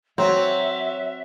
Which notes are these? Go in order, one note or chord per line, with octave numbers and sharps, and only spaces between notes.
F#3 C4 E5